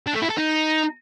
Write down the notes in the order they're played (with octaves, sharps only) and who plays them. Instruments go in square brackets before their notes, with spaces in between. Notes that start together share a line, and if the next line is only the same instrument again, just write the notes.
[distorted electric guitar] D4
A3
E4
A4
D#4